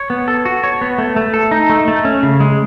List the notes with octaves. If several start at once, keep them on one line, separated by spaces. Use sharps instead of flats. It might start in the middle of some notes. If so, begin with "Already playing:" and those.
Already playing: C#5
B3
A4
F#4
C#5
B3
A3
A3
A4
D#4
A3
A3
C#4
C#3
G#3